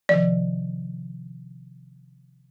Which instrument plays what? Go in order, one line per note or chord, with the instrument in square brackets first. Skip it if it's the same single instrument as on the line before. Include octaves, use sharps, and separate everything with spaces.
[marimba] C3 D#3 F3 [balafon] D5